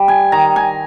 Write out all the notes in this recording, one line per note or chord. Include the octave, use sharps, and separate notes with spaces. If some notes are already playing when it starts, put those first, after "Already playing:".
Already playing: G3
G#5
D#3 A#5
G#5